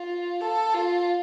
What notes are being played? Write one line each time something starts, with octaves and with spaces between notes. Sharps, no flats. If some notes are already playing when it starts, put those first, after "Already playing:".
Already playing: F4
A4
F4